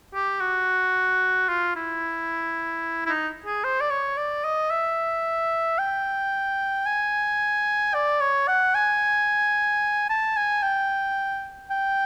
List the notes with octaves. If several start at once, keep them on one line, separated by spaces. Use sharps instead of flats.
G4
F#4
F4
E4
E4
D#4
G#4
C5
D5
C#5
D5
D#5
E5
G5
G#5
D5
C#5
F#5
G#5
A5
G#5
G5
G5